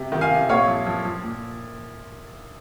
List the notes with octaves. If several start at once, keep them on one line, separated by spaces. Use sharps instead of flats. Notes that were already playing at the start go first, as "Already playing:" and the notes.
Already playing: C3
D#3
F5 G#5
C3
A#2 C#5 F5
F3
F3
F3
A#2